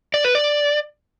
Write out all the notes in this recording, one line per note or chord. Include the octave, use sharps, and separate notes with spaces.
D5
B4
D5